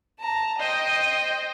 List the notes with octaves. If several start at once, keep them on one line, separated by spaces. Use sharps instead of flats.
A5 A#5
C5 D#5 G5